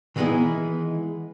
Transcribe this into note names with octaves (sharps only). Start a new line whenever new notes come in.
D#3 E3 G#3 B3 E4 G#4